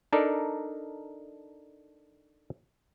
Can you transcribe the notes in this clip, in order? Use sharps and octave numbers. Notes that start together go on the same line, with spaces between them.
D4 D#4 A4 A#4 D5